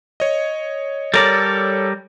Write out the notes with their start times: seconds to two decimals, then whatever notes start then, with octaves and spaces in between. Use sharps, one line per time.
0.20 C#5 D#5
1.14 G3 A4 A#4 C#5 D5